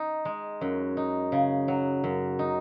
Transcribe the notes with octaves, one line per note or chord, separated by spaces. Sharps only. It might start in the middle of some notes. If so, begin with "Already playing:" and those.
Already playing: D#4
G#3
F#2
D#4
C#3
F#3
F#2
D#4